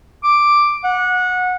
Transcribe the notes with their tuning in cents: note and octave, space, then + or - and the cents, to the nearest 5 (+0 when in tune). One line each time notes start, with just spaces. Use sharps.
D6 +5
F#5 -25